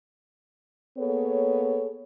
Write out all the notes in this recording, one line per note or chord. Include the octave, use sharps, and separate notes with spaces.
A#3 B3 G#4 A4 C#5